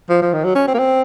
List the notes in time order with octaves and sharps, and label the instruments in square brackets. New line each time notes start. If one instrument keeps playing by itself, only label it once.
[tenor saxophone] F3
F3
D#3
F#3
C#4
C4
A#3
C4